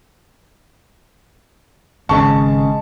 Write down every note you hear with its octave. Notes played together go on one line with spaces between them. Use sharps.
G#1 C#3 G#3 A5 C#6